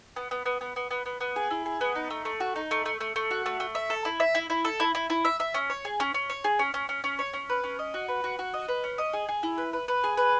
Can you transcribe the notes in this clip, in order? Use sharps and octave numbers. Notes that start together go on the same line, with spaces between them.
B3
B3
B3
B3
B3
B3
B3
B3
G#4
E4
G#4
B3
D#4
A3
A3
F#4
D#4
A3
A3
A3
A3
F#4
A3
A3
E5
A4
E4
E5
E4
E4
A4
E4
E4
E4
E5
E5
C#4
C#5
G#4
C#4
C#4
C#5
G#4
C#4
C#4
C#4
C#4
C#5
C#4
B4
C#4
D#5
F#4
B4
F#4
F#4
D#5
B4
C#4
D#5
G#4
G#4
E4
B4
B4
B4
G#4
B4